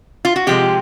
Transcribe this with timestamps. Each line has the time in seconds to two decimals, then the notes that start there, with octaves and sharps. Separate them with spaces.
0.25 F4
0.36 F#4
0.47 C3 F3 G#3 G4